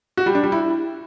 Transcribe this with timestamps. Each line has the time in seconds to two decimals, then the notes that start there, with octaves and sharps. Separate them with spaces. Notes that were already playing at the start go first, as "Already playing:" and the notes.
0.17 F#4
0.26 G3
0.35 D4
0.43 G3
0.52 E4